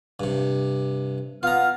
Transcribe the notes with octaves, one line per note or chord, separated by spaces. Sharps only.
G2 C3
B3 F4 A#5 F6